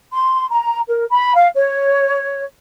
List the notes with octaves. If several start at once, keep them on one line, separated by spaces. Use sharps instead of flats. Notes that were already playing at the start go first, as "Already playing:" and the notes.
C6
A#5
A#4
B5
F5
C#5